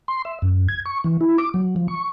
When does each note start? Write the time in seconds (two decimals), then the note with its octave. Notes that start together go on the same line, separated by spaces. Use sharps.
0.08 C6
0.25 E5
0.42 F#2
0.68 G#6
0.86 C#6
1.04 E3
1.21 E4
1.38 D6
1.54 F#3
1.76 F3
1.88 C#6